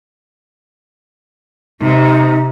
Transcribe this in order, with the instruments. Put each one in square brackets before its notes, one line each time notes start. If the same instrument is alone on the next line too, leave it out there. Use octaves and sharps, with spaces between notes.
[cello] C3 [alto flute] D#4